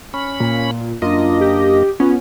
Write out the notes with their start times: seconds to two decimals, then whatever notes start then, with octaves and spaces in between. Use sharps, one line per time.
0.14 C#4 B5
0.40 A#2
1.02 F#2 A#3 D4 F4 D#5
1.41 G4
2.00 B3 C#4 F4